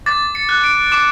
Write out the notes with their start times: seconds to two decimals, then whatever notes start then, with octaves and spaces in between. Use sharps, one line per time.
0.06 D6 A6
0.35 C#7
0.49 F#6
0.64 D7
0.92 D6 E7